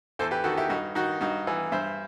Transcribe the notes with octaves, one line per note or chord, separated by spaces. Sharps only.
E2 A4 C5
G4 B4
D#3 F#4 A4
E4 G4
G2 D#4 F#4
D#3 D#4 F#4
G2 D#4 F#4
E3
G2 C5 E5